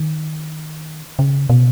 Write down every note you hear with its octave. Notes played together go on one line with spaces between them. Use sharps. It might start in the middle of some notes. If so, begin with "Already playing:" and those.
Already playing: D#3
C#3
B2